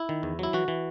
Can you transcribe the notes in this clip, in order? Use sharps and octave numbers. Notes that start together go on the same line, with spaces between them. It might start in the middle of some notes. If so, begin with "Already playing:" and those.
Already playing: E4
D#3
E2
F#3 E4
E3 F#4
E3